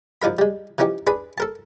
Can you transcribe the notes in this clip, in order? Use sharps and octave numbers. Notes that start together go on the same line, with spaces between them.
F#2 F3 D#4 A#4 B5
G3 G#3
E3 F3 C#4 D#4 G4
D4 G#4 B4 B5
A4 A#4 A5